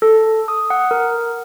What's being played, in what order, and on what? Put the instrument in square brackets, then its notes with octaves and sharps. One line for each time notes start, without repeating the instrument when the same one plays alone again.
[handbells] A4
D#6
F#5
A#4